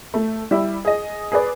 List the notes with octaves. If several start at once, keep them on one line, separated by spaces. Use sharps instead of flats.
A3
G3 E4
G#4 D#5
G#4 B4 D5